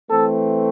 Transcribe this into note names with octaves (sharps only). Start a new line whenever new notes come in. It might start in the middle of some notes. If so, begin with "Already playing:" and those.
E3 A3 C4 A4